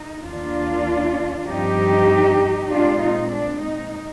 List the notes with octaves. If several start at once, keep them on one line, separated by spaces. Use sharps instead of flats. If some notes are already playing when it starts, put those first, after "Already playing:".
Already playing: D#4
D#2 D#3 A#3 D4 F4
G2 F3 C4 D#4 G4
A#2 G#3 C4 D4 F4
D#4
D4
D#4